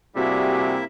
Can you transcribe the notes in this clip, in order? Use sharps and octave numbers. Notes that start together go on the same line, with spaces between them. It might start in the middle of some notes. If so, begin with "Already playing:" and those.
C3 G3 A#3 E4 F#4 G#4 E5